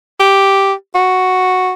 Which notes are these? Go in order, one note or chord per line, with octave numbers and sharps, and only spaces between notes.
G4
F#4